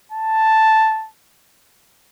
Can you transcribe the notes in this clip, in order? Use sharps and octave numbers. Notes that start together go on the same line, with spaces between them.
A5